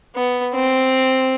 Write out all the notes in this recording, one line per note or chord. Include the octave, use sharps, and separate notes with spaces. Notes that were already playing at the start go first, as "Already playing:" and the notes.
B3
C4